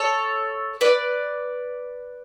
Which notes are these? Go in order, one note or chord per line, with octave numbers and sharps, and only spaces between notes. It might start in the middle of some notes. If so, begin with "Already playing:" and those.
Already playing: A4 C#5
B4 D5